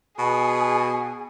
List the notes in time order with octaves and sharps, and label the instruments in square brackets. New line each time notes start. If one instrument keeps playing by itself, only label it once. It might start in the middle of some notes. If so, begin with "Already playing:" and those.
[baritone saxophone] B2 [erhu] G#4